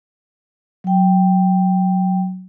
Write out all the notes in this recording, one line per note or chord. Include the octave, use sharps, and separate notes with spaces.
F#3 G5